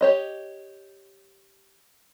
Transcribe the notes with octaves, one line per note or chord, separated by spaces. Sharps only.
G4 C#5 D#5